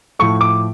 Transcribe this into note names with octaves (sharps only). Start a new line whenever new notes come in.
A2 F3 A3 C#6
D6